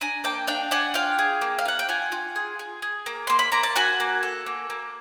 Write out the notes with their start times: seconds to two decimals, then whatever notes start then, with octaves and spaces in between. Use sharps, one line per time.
0.01 D4 G#5 A#5
0.24 A#3 G5 A5
0.47 D4 F5 G5
0.71 D4 F#5 G#5
0.94 F4 F5 G5
1.19 G#4
1.41 A#3
1.59 F5
1.65 F4 F#5
1.79 G5
1.89 F4 F#5 G#5
2.12 F4
2.36 G#4
2.59 G#4
2.82 G#4
3.06 A#3
3.27 A#3 C6
3.39 B5
3.52 A#3 A#5
3.63 A5
3.76 F#4 F#5 G#5
4.00 A#3
4.23 A4
4.46 A#3
4.70 A#3